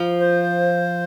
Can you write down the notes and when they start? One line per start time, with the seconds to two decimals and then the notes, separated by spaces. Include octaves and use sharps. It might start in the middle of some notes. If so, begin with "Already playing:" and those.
Already playing: F3
0.20 C5